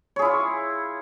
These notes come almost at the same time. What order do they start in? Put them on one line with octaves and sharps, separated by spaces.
C#5 G#4 E4 F4